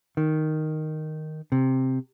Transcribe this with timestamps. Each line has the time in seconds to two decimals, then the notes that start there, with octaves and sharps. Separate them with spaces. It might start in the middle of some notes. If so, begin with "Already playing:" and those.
0.17 D#3
1.52 C3